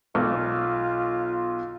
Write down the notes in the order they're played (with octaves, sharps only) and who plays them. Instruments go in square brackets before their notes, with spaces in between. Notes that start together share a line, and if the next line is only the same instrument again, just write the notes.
[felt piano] B1 [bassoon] F4